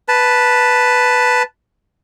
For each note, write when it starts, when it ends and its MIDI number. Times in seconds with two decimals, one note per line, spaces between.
0.08 1.43 71
0.08 1.43 81